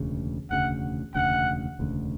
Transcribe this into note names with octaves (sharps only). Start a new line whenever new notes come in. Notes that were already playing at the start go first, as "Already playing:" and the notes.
Already playing: E1 D2 C#3
E1 D2 C#3 F#5
E1 D2 C#3 F#5
E1 D2 C#3